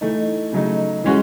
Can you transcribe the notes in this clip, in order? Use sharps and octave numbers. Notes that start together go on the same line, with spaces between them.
E3 A3 D#4
C#3 F#3 A3 D#4
E3 G#3 C#4 F#4